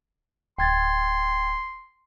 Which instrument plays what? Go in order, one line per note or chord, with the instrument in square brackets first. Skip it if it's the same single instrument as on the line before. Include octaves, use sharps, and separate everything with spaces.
[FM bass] D1 [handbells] G5 G#6 A6 [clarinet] C6